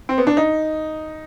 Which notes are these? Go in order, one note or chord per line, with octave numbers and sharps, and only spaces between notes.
C4
B3
D4
D#4